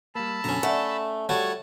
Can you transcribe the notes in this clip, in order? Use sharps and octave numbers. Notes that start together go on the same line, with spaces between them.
G3 A#3 A5 B5 E6
F#2 B2 D3 C#4 A#5
A3 D5 E5 F#5
G3 A3 F#4 C#5 A5